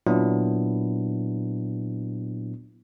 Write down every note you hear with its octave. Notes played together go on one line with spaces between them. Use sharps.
A#2 F#3 B3 D4 E4